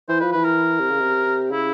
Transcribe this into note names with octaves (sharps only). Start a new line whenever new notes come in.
E3 C5
F3 B4
E3 B4
A#4
C3
C#3
C3
C#3 E4